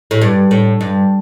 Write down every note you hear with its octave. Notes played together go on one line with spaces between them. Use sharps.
A2
G2
A2
G2